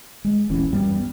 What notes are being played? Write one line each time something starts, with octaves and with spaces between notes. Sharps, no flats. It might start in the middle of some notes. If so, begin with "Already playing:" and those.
G#3
D#1 A#1 E3 C#4
F#2 G3 B3